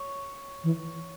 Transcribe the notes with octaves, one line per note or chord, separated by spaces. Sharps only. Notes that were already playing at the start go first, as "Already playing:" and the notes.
Already playing: C#5
E3